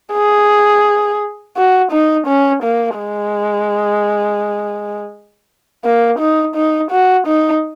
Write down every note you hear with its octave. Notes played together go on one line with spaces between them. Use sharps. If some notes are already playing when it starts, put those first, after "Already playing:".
G#4
F#4
D#4
C#4
A#3
G#3
A#3
D#4
D#4
F#4
D#4